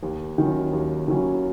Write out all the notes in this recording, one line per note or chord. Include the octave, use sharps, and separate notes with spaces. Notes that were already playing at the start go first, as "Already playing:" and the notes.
D#2
D#3 F#3 C#4 E4
D#2
D#3 F#3 C#4 E4